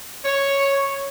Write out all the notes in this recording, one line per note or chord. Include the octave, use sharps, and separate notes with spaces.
C#5